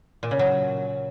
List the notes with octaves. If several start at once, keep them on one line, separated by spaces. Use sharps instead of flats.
A#2
C#3
F#3